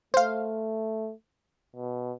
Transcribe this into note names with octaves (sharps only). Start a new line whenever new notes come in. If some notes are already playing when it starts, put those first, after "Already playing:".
A3 C5 F5
B2